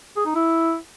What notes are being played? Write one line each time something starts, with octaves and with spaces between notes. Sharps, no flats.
G#4
D#4
E4